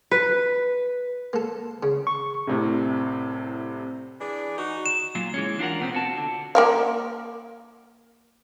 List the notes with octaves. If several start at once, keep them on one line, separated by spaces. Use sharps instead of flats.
B4
A#3 A4
C#3
C#6
C2 A2 C3
E3 D4 G#4
D#4 F#4
E7
A#2 F#3 F4
E3 G#3 C#4
D4 F4 G4 A#4 F#5
B2 B3 C4
F4 F#4 A5
D3
A#3 A#4 F5